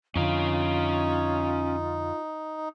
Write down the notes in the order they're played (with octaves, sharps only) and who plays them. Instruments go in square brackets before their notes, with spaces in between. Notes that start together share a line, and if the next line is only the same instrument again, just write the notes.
[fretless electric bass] F2 D3 [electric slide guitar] C#4 F5 [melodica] D#4 [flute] F4